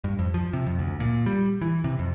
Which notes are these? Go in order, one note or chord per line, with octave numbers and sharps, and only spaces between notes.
G2
F2
F3
C3
F2
D2
A#2
G3
E3
C3
F2